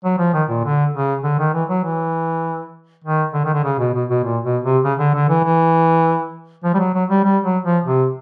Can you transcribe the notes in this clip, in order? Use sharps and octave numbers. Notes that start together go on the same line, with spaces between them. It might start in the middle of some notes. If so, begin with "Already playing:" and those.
F#3
F3
D#3
A#2
D3
C#3
D3
D#3
E3
F#3
E3
D#3
D3
D#3
D3
C#3
B2
B2
B2
A#2
B2
C3
C#3
D3
D3
E3
E3
F3
G3
F#3
F#3
G3
G3
F#3
F3
C3